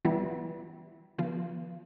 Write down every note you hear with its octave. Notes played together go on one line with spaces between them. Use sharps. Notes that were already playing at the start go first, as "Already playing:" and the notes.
E3 G3 B3 E4
D3 F3 B3 F4